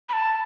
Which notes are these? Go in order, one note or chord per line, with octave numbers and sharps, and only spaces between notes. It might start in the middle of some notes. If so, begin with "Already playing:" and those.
B5
A5